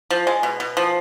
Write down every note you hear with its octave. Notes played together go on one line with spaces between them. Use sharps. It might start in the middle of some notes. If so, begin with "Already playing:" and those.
F3
G#3
B2
B2
F3